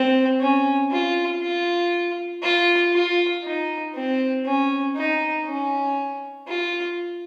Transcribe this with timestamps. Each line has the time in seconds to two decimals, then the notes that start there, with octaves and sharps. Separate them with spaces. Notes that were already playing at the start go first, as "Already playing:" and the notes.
Already playing: C4
0.40 C#4
0.91 F4
1.42 F4
2.43 F4
2.93 F4
3.44 D#4
3.95 C4
4.45 C#4
4.96 D#4
5.46 C#4
6.48 F4